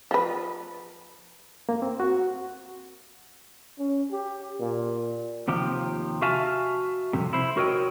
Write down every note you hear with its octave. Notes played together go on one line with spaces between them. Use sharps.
F3 B4
A#3
C4
F#4
C#4
G4
A#2
D#2 C3 F3 G4
F#4 E5 F5 G#5 A5
C2 F2 C3
E4 C5
F#4 A#4 C#5 D#5 G5